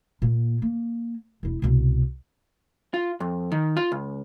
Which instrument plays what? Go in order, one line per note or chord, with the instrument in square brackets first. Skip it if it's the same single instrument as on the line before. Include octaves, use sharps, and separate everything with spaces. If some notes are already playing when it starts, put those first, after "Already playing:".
[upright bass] A#2 A#3
A#3
E1 E4
C2 B2
[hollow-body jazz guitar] F4
F2
D#3
F4
C#2